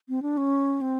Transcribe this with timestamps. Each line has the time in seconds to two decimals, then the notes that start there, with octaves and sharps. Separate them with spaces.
0.09 C4
0.22 D4
0.37 C#4
0.81 C4